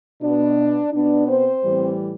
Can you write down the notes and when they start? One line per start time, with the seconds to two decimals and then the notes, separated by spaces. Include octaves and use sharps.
0.20 B2 B3 D4
0.92 B2 B3 D4
1.27 C4 C5
1.63 A2 E3 G3 C4